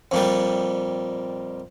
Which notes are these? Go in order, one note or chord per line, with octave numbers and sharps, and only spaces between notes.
F2 A#2 G3